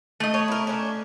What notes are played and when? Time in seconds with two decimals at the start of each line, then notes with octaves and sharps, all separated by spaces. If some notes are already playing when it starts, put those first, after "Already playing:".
0.20 A3 D#5
0.34 C#5
0.48 E4 A#4
0.67 C#4 D4